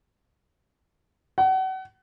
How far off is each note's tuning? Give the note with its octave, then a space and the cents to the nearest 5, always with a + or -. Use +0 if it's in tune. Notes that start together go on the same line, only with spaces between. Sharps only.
F#5 +35